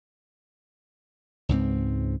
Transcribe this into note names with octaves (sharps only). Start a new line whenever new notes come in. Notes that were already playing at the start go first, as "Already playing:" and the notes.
C#2 G#2 G3 C4